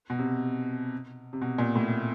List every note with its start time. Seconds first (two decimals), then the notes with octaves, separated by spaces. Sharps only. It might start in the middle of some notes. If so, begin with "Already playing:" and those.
0.10 B2
0.19 C3
1.33 C3
1.42 B2
1.58 A#2
1.75 A2